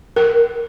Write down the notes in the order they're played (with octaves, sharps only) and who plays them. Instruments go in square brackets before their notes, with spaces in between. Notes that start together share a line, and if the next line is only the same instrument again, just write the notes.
[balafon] A#4